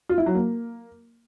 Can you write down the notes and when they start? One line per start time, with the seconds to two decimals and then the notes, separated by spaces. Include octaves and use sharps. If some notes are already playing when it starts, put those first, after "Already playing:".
0.09 F4
0.18 E4
0.26 F#3
0.35 A#3